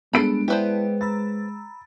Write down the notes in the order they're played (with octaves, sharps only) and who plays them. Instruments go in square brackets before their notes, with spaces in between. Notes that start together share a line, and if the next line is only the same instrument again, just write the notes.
[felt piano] G3 G#4 D7 [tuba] G#3 [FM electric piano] B3 D4 [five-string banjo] A4 B5
[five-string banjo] B3 B4 C5 [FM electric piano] E4 A5 [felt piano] D5 E5 G5
[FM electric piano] A#5 B5 E6 [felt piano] A6